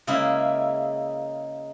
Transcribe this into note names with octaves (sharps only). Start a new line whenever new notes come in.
C#3 G#3 A#3 E4